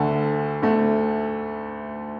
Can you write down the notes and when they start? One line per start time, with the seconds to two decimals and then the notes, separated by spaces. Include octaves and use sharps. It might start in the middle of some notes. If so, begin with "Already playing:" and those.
Already playing: D2 D3 A3
0.62 D2 D3 A3